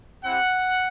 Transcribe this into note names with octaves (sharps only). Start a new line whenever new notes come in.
C4 E4 G4 F#5